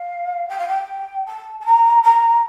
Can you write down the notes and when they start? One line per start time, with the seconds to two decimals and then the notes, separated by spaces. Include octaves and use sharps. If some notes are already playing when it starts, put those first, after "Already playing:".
Already playing: F5
0.49 G5
0.58 F5
0.67 G5
1.26 A5
1.60 A5
1.65 A#5
2.03 A#5